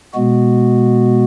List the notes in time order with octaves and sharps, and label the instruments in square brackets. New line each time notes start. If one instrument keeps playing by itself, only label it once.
[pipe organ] B2 G#3 B3 F#4